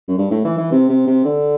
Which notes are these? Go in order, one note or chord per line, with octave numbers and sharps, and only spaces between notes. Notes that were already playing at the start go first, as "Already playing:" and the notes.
F#2
G2
A2
E3
E3
C3
C3
C3
D3